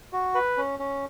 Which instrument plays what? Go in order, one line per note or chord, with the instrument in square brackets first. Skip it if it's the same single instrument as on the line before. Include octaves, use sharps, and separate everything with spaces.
[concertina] F#4
B4
C#4
C#4